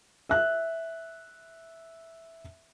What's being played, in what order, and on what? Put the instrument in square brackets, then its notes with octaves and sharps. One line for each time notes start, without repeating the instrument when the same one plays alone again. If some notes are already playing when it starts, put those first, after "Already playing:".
[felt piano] E5 F#6